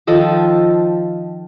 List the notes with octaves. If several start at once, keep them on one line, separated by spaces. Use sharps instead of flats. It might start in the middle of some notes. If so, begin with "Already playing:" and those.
D#3 F3 A4 D#5